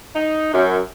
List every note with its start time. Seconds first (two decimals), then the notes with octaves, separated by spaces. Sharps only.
0.16 D#4
0.54 F#2